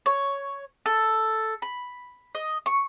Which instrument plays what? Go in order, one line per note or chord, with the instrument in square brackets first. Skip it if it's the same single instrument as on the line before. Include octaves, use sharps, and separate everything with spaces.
[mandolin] C#5
A4
B5
D#5
C#6